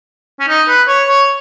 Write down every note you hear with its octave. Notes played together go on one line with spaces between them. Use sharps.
C#4
D#4
B4
C#5
C#5